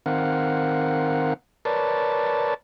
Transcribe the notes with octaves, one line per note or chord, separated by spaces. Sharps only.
D#3 C4 A#4 F5 F#5
A#4 B4 C#5 D5 A5